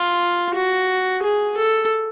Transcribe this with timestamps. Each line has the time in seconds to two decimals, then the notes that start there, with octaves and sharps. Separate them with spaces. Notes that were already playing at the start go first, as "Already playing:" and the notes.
Already playing: F4
0.55 F#4
1.22 G#4
1.57 A4